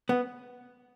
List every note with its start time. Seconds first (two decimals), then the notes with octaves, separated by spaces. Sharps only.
0.09 B3